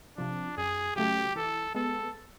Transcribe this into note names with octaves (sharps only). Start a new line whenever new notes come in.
C3 F3 D4
F#2 G#4
C#3 F#3 A3 G4
E3 A4
G#3 B3 A4